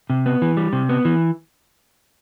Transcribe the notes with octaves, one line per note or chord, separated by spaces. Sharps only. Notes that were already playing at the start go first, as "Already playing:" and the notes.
C3
B3
E3
G3
C3
B3
E3